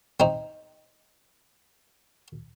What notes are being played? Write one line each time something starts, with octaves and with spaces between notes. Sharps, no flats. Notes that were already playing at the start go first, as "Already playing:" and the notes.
C4 D#4